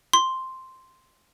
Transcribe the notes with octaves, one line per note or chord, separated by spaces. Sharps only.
C6